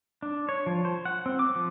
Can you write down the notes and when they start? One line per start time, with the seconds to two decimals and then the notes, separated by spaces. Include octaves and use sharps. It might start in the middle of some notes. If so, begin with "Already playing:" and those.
0.22 D4
0.49 C#5
0.66 F3
0.85 C5
1.05 F#5
1.26 C4
1.39 D6
1.55 F3